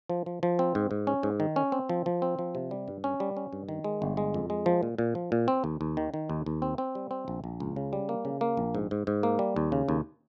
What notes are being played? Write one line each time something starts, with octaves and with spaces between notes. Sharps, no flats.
F3
F3
F3
C4
G#2
G#2
C#4
G#2
D#3
C#4
C4
F3
F3
C4
F3
C3
G3
G2
C#4
G3
C#4
G2
D#3
G#3
G1
G#3
F2
G#3
F3
A#2
A#2
F3
A#2
C4
D#2
D#2
D#3
D#3
D#2
D#2
C4
C4
G3
C4
A#1
A#1
C#2
C#3
G3
A#3
C#3
A#3
A#1
G#2
G#2
G#2
A#3
G3
D#2
C#3
D#2